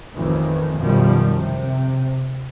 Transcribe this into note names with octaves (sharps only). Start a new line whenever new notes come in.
A1 F2 A2 D#3 E3
F#2 B2 D#3 F3 G3
C3